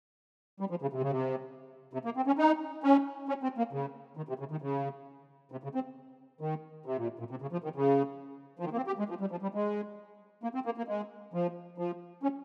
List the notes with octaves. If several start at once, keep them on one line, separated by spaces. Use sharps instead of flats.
G3
F3
C#3
C3
C#3
C3
C3
A#3
C4
C#4
D#4
C#4
C#4
C4
A#3
C#3
D#3
C3
C#3
D#3
C#3
C3
C#3
C4
D#3
C3
A#2
A#2
C3
C#3
F3
D#3
C#3
F3
D#3
A#3
C4
G4
G#3
F3
G3
F3
G3
G#3
A#3
C4
A#3
A#3
G#3
F3
F3
C#4